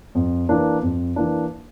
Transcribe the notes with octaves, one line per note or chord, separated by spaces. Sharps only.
F2
E3 A#3 D4
F2
E3 A#3 D4